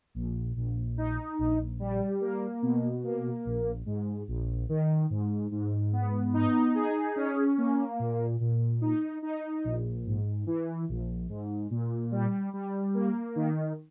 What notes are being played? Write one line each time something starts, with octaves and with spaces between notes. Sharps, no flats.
A#1
A#1
D#4
A#1
G3
A#3
B2
A#3
A#1
G#2
A#1
D#3
G#2
G#2
B3
D#4
G#4
C#4
A#3
A#2
A#2
D#4
D#4
A#1
G#2
E3
A#1
G#2
A#2
G3
G3
A#3
D#3